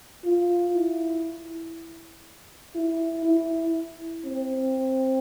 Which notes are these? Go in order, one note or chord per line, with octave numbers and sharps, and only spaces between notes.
F4
E4
E4
E4
C4